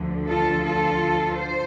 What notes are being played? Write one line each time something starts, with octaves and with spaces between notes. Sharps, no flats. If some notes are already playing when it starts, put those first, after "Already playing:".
Already playing: D2 D3 F3
F4 A4
F4 A4
C5